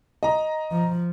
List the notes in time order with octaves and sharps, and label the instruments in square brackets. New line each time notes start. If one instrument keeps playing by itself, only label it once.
[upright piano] D#5 A#5
[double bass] F3